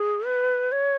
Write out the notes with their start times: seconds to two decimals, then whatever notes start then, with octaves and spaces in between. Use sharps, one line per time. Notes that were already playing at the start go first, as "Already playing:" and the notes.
Already playing: G#4
0.26 B4
0.72 C#5